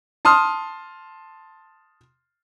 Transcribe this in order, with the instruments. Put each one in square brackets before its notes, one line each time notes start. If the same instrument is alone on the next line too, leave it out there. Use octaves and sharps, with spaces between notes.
[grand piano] A5 C6 D#6 F6